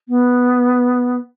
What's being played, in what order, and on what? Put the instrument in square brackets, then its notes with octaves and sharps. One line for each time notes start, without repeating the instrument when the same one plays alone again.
[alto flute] B3